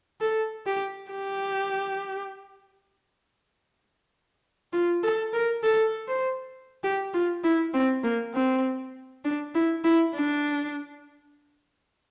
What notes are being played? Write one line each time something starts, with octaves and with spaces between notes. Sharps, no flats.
A4
G4
G4
F4
A4
A#4
A4
C5
G4
F4
E4
C4
A#3
C4
D4
E4
E4
D4